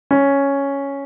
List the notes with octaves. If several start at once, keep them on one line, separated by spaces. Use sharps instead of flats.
C#4